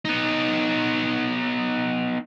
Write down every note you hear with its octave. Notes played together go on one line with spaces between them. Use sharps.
B3 D#4